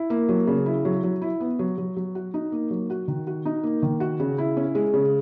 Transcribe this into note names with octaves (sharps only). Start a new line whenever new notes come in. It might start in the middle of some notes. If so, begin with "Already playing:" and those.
Already playing: E4
A#3
F#3
C#3
E4
F#3
F#3
E4
B3
F#3
F#3
F#3
F#4
D#4
A#3
F#3
F#4
D#3
F#4
D#4
A#3
D#3
F#4
C#3
E4
C#4
G#3
C#3